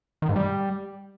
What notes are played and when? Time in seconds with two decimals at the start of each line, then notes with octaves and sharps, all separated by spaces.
0.22 D#3
0.29 G#2
0.36 G3